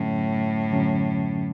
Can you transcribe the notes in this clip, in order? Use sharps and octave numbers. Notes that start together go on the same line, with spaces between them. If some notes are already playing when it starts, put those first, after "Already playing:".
Already playing: F#2 A2 D3 F#3 C#4
F#2 D3 F#3 C#4